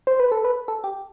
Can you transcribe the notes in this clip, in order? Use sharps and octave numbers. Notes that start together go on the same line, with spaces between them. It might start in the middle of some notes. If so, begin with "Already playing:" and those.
C5
B4
A4
B4
A4
G4